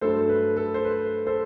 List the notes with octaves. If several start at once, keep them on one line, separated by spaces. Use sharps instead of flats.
G2 F#3 A3 A4 C5
B4
A4
C5
B4
A4 C5